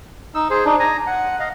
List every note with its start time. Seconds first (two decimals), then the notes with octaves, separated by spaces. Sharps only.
0.35 D#4 E6
0.50 G#4 C5
0.65 D4 D#4
0.80 G#5 A#5
1.07 F#5
1.39 D#5 F5